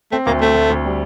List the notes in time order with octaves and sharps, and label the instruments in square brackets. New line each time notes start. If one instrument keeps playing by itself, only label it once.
[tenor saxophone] A3 [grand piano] C4
[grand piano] D2 [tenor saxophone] A#3
[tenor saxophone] A3 [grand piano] C4
[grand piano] D2
D2
G3